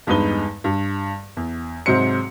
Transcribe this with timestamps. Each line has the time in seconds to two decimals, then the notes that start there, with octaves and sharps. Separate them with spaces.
0.07 E2 G2 G#3 D#4 B4 G7
0.64 G2
1.37 E2
1.86 G#2 C3 F#3 G#3 C5 C#7